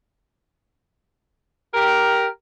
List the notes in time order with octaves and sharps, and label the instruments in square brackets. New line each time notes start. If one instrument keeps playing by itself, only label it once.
[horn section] G4 A#4